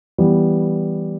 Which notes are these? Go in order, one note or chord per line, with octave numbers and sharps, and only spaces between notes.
E3 G3 B3